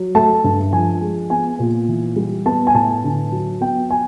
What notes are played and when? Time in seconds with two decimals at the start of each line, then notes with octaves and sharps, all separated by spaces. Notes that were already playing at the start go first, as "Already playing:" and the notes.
Already playing: F#3
0.15 A3 A5
0.44 G2
0.73 F3 G#5
1.01 G#3
1.30 B3 G#5
1.59 A#2
1.88 E3
2.16 G3
2.46 B3 A5
2.67 G#5
2.74 A2 A5
3.04 D3
3.32 F#3
3.61 B3 G5
3.90 G#5